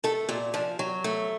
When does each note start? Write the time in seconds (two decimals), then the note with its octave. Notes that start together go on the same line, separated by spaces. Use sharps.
0.04 A3 A4
0.29 A#2 F4
0.54 F3 D4
0.79 F#3
1.04 A3